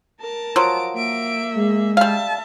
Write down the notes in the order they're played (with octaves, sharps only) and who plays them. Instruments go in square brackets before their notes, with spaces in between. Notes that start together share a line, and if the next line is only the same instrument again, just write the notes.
[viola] A#4 A5
[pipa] F3 F#3 [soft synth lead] D7
[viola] A#3 E5 [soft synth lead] D7
[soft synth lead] G#3
[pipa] G3 F5 [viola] E5 A5